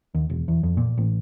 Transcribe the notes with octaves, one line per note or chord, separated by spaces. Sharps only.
D#2
E1
E2
F2
A#2
A1